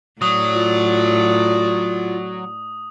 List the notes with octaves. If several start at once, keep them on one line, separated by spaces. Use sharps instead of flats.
A2 F#3 D5 D#6
F4